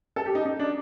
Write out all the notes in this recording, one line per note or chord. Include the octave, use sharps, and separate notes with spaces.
A4
G4
D#4
D#4
D4